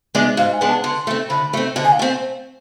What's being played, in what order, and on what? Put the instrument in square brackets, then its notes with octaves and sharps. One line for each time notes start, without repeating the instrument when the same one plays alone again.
[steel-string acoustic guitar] G#3 B3 D4 [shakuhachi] E5
[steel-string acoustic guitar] G#2 [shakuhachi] F5
[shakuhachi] G#5
[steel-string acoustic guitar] G#3 B3 D4
[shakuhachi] A5
[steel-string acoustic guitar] D3 [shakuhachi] C6
[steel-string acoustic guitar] A3 C4
[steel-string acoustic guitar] D3 [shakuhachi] B5
[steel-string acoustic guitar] A3 C4
D3
[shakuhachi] G#5
F5
[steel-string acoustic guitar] A3 C4